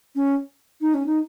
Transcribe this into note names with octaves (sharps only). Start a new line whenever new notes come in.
C#4
D#4
C#4
D#4